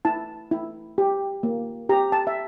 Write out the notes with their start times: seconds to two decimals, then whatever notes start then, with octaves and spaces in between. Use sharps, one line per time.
0.05 E4 A5
0.51 E4
0.98 G4
1.43 A#3
1.89 G4 A#5
2.12 A5
2.27 E5